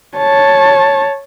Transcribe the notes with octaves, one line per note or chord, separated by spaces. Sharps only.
C#5 A5